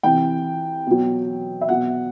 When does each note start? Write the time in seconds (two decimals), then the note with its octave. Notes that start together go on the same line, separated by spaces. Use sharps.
0.03 C3 E3 G5
0.87 B2 F#3
1.61 E5
1.68 B2 F#3 F#5